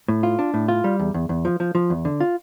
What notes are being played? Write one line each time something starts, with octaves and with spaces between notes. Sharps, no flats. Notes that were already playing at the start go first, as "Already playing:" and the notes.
A2
F4
D4
A2
F4
G3
E2
E2
E2
F3
F3
F3
E2
D3
F4